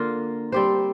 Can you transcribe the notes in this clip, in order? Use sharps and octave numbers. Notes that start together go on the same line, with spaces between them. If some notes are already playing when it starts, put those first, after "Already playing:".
Already playing: D3 A#3 F4
G3 C4 G4 C5